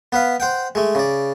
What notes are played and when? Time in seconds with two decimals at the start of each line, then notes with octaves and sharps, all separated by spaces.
0.12 B3 B4 F5
0.40 C5 F#5 G5
0.75 G#3 A3
0.95 C#3 D5